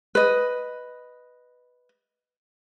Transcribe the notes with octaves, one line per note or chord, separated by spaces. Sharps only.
B4 D#5